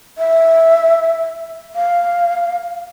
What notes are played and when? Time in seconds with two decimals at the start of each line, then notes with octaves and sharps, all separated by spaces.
0.18 E5
1.75 F5